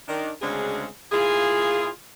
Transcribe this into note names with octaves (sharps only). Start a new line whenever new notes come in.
D#3 D4
D2 C#3 G#3 C4 D4 G#4
A#2 E4 F4 G#4